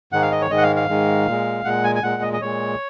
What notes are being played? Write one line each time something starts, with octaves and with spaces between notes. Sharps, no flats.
G#2 D#3 G#3 F#5
F5
D#5
C#5
G#2 D#3 G#3 D#5
F#5
F5
F5
G#2 D#3 G#3
A#2 G#3
A#2 G#3 F#5
G#5
G#5
A#2 G#3 F#5
D#5
D#5
A#2 G#3 C#5